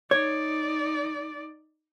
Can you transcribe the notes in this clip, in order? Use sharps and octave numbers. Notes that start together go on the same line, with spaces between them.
D#4 C#5 D5